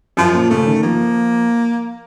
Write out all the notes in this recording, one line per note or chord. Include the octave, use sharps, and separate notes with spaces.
F#2 F3
A#2
C#3 A3
D#3
F3 A#3